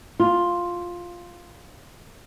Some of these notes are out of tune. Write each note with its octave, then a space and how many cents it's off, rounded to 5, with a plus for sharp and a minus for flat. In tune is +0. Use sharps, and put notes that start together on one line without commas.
F4 +5